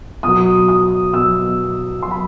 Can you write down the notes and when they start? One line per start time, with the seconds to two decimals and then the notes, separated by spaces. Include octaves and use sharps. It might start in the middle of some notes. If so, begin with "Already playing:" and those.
0.23 B2 F#3 D#6
0.68 D#6
1.13 B2 F#3 E6
2.02 B2 F#3 C6
2.11 B5